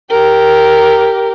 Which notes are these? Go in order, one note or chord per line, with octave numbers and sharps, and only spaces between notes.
G4 A#4